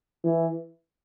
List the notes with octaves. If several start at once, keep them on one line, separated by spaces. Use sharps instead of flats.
E3